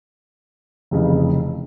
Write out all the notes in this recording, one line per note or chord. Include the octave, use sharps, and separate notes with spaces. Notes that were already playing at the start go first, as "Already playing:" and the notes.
F1 F2 C#3 E3